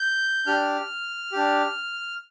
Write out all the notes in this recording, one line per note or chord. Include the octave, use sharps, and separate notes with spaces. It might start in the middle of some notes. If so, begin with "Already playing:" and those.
Already playing: G6
D4 G4 F6
D4 G4